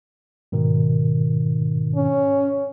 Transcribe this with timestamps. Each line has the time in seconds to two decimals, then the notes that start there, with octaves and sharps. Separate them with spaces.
0.52 G#2 B2 D#3
1.96 C#4